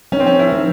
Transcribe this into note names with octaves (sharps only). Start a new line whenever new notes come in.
F3 C#4
C4
C#4
E4
F3